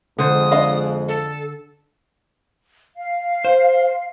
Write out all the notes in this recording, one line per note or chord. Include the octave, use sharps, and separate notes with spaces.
F2 D3 G#3 C5 D#6
D4 D#5 F5
A4
F5
C5